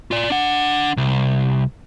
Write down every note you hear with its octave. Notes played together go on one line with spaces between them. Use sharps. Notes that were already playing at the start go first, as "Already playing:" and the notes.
F4 D5
D4 F#5
C2